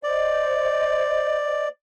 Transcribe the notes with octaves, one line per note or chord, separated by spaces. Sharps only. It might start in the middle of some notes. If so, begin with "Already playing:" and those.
C5 D5 D#5